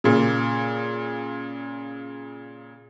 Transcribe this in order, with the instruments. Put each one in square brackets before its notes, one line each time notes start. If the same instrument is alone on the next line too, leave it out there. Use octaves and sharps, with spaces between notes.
[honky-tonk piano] A#2 C#3